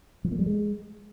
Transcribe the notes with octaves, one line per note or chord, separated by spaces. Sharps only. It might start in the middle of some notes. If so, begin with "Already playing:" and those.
F3
A#3
G3
G#3